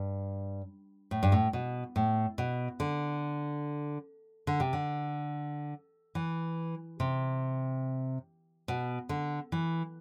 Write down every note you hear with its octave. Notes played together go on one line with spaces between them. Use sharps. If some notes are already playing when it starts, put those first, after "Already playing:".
Already playing: G2
A2
G2
A2
B2
A2
B2
D3
D3
C3
D3
E3
C3
B2
D3
E3